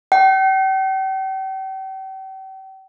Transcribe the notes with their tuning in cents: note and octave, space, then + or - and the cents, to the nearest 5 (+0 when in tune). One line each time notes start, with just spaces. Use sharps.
G5 -40